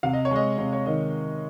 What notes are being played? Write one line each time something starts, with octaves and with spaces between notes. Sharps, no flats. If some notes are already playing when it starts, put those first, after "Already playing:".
C3 F5
D#5
C#5
G#3 D#5
C3 C#5
C#5
D#3 D#5